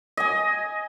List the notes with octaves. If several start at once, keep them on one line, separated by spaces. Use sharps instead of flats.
D#5 G#5